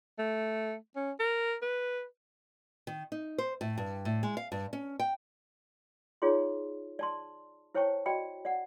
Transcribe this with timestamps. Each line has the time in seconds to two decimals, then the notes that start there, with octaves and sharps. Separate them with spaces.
0.19 A3
0.96 C#4
1.20 A#4
1.62 B4
2.87 D#3
3.12 D#4
3.38 C5
3.61 A2
3.78 G2
4.05 A2
4.23 G#3
4.37 F5
4.52 G2
4.73 C#4
5.00 G5
6.22 D#4 F4 G#4 C#5 D5 C6
6.99 D5 A5 C6
7.74 E4 C5 C#5 G5 A5 C#6
8.06 F#4 D5 D#5 G5 B5
8.45 D5 F#5